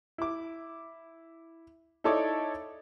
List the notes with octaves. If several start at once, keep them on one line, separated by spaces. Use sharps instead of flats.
E4 D6
D#4 E4 A4 C#5 D5 D6